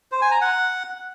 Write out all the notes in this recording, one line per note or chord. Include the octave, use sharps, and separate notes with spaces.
C5
G#5
A#5
F#5